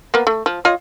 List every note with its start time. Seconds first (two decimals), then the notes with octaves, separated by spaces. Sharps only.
0.14 A#3 B3
0.27 A3
0.46 F3
0.65 F4 C#5 D#5